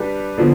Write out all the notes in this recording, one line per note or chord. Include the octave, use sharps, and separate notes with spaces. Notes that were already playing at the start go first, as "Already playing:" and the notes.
Already playing: G3 D4 G4 B4
D3 F3 B3